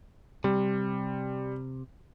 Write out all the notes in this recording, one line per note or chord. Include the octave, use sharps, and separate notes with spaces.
C3 G3